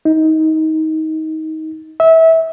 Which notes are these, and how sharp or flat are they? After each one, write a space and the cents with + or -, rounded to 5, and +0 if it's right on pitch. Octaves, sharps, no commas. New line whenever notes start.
D#4 +20
E5 -25